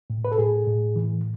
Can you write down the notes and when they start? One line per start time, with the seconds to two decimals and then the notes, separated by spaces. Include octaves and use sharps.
0.10 A2
0.25 B4
0.32 A4
0.38 A2 G#4
0.67 A2
0.96 E3